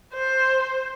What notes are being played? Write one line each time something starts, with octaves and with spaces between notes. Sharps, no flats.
C5